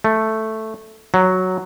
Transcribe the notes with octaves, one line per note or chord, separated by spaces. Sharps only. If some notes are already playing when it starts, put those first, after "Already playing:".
A3
F#3